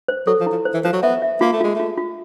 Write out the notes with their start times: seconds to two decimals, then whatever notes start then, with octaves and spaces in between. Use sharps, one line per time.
0.08 C5
0.27 F#3 A4
0.40 F3
0.46 E4
0.52 F3
0.65 C5
0.74 E3
0.85 F3 C5
0.93 F#3
1.03 B3 E5
1.22 E5
1.41 A#3 F4
1.53 A3
1.61 G#3 F4
1.76 A3 F4
1.98 F4